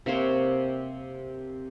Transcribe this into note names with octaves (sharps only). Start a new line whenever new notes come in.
C3 A#3 C5 C#5